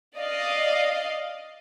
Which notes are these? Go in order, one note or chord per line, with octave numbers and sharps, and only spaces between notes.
D5 D#5 F5